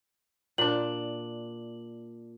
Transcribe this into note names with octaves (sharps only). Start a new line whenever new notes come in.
A#2 D4 F#7